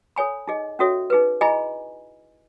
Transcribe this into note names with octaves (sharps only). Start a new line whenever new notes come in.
A4 C#5 G#5 B5
D#4 G#4 D#5
C#4 F#4 A4 C#5 E5
D#4 G#4 B4
E4 G#4 D#5 G#5 B5